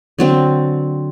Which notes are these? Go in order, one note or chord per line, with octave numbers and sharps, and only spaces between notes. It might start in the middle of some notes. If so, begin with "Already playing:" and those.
D3 F#3 C4